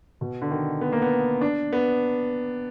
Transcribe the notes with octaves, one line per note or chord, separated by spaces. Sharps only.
B2
D3
D#3
B3
A#3
B3
D4
B3